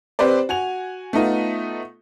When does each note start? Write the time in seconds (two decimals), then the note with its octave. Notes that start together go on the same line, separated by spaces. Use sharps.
0.19 C4 G4 B4 C5 D5
0.49 F#4 G#5 F7
1.13 A3 B3 D#4 F4